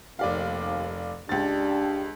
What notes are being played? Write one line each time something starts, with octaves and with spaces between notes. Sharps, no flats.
F1 D#2 D5 F5
C#2 D4 G4 A6